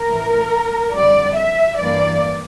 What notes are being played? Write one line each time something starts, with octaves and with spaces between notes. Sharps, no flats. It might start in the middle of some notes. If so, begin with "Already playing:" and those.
Already playing: A#4
A2 E3 A3
F2 D3 G3 D5
E5
G2 E3 A#3 D5